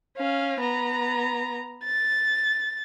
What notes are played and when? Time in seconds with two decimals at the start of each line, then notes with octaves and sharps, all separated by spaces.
0.17 C#4 F5
0.60 B3 A#5
1.84 A6